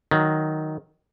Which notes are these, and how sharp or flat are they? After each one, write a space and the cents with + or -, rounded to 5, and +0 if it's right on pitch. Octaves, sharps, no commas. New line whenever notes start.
D#3 +0 F#3 +0